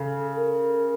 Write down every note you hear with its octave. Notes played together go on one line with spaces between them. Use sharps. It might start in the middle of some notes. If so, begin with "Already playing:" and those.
Already playing: C#3 A4
A#4